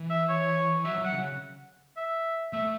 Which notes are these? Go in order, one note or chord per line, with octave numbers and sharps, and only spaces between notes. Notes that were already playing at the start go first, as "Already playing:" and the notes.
Already playing: E3
E5
C#5
F#3 E5
F#3
F#5
C#3
E5
A3 E5